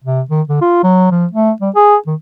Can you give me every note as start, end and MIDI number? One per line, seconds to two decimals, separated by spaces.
0.04 0.21 48
0.30 0.41 51
0.49 0.59 50
0.61 0.79 65
0.83 1.10 54
1.11 1.26 53
1.33 1.51 57
1.61 1.70 55
1.75 1.96 68
2.07 2.15 51